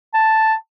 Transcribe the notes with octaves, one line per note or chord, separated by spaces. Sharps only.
A5